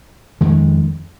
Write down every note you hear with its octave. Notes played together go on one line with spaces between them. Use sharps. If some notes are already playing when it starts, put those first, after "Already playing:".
F2 D#3 G#3 C#4